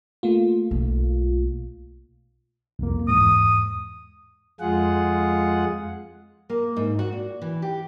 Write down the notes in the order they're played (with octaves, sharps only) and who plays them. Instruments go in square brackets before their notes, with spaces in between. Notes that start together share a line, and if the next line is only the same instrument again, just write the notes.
[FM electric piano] A3 A#3 F4
[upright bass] B1
[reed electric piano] C2 F2 A#3
[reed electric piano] E2 G#2 [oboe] D#6
[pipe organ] F2 G#3 F4 G#4 F#5
[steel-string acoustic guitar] A#3
G#2
F#4
A#2
E3
G4